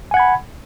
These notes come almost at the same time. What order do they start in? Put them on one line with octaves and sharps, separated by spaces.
G#5 F#5 G#6 B5